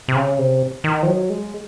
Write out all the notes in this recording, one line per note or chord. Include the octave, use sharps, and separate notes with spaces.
C3
C#3
C3
D#3
F3
F#3
G#3